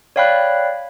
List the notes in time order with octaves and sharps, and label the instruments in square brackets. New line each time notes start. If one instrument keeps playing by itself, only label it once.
[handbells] C#5 D5 F5 G5 B5 F#6